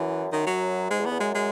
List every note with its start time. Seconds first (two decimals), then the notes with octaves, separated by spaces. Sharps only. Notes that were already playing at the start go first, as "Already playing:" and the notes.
Already playing: F#2 E3
0.32 F#2 D#3
0.47 F#3
0.91 G#2 G#3
1.00 E2
1.06 B3
1.11 E2
1.20 F#2 G#3
1.35 G#3